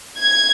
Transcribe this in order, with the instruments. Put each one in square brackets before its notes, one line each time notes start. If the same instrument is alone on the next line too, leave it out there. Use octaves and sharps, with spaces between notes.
[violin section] G#6